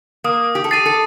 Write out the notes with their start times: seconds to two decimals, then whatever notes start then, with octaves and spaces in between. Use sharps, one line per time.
0.24 A#3 D#6
0.55 G4
0.64 A4
0.71 G4 A6 C7 D#7
0.86 A4